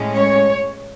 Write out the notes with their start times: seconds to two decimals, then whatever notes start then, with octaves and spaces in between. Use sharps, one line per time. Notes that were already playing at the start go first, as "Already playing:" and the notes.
Already playing: A2 G#3 C#4
0.14 C#5